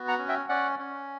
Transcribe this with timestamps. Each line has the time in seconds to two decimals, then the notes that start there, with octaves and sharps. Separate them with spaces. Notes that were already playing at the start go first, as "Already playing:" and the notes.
Already playing: B3 F#4
0.08 F#5 A#5
0.19 C#4
0.28 E5 G5
0.49 C#4 D5 F#5
0.79 C#4